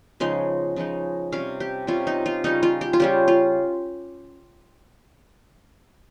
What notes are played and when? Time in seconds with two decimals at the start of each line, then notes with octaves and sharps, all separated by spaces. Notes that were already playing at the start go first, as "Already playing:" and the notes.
0.20 C#3 F3 G#3 D#4 C6
0.76 C#3 F3 G#3 D#4
1.32 C3 G3 C#4 F5
1.60 G4
1.87 C3 G3 C#4 F4
2.07 D#4
2.26 F4
2.44 C#3 G3 C#4 D#4
2.63 F4
2.81 G4
2.93 F4
3.00 C#3 G3 C#4 G4
3.28 F4